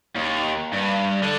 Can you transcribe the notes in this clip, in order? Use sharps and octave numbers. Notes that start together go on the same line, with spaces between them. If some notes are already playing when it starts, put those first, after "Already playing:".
D#2
G2
D3